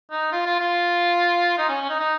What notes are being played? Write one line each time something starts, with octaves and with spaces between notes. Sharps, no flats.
D#4
F4
F4
F4
D#4
C#4
C#4
D#4
D#4